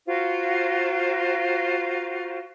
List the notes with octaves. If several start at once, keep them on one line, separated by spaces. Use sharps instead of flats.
F4 F#4 A#4 C5